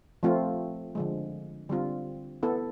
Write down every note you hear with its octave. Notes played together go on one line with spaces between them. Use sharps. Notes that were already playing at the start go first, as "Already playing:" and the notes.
F3 A3 C4 F4
D3 F3 G#3
D3 G3 C4 F4
B3 E4 A4